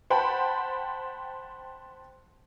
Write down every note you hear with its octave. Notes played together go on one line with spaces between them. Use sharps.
C5 F#5 G5 A5 B5